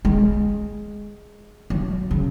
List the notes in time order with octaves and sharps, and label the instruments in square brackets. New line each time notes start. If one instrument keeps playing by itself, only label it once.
[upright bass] G#3
F#3
C#3